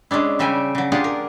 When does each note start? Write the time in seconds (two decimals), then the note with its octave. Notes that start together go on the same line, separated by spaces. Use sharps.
0.11 G#3 C#4 D4 E4
0.39 C#3 G3 E5 G5 G#5
0.75 C#3 F#3
0.92 D4 F4 G4 G#4 F#5
1.04 A#4